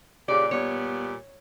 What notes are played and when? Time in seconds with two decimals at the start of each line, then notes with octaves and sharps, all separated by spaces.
0.28 A#2 C#3 G4 D5
0.51 A#2 G3 B3 C#5